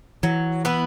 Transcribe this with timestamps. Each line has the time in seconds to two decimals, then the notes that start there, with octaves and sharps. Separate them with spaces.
0.23 E3 F#3
0.65 B3 E4 B4